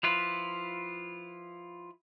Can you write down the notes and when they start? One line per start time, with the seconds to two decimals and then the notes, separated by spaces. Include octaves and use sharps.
0.03 F3 E4 F4 B4